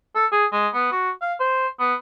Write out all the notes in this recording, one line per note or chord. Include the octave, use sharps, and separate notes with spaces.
A4
G#4
G#3
B3
F#4
F5
C5
B3